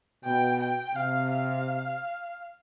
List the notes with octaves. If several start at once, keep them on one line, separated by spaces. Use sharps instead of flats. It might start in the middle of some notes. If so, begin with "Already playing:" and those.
B2 G5
G5
C3 F5
F5